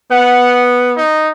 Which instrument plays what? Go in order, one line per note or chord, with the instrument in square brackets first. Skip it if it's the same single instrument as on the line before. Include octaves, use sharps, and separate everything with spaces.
[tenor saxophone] B3 [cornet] F#5
[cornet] D#4